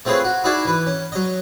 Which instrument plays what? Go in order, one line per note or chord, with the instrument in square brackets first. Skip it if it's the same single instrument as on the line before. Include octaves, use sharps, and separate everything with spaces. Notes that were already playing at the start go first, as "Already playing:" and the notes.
[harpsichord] A3 C4 F4 G#4 B4 C#5
F#4
D#4 E4 F#4 G#4 D5 E5
E3 B4
C#4
F#3 D#5